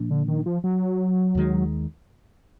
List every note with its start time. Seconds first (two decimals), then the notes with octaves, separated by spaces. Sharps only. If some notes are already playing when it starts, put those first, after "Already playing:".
Already playing: A#2 F3 A#3 D4
0.10 D3
0.28 D#3
0.46 F3
0.64 F#3
1.35 D#2 D#3 G#3